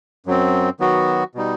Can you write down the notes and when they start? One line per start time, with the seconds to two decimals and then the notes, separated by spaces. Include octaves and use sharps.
0.26 F#2 F#3 C4
0.80 D#3 F#3 B3 F#4
1.35 B2 G3 D#4